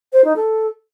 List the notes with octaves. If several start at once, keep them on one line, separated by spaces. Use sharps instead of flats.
C5
D#4
A4